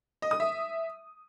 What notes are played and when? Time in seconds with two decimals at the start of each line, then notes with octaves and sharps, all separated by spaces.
0.22 D#5
0.31 D#6
0.40 E5